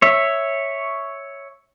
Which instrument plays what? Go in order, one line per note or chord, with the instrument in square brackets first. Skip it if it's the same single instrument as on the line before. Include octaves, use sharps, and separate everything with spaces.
[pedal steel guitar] C#5 E5